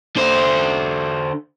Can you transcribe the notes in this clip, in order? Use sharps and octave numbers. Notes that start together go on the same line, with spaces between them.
D3 C5